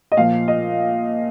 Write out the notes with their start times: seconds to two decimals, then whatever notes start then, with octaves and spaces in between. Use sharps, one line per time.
0.12 D#5
0.17 A#2 F3 F5
0.48 D#5